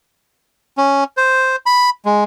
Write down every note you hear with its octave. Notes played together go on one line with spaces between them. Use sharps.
C#4
C5
B5
G#3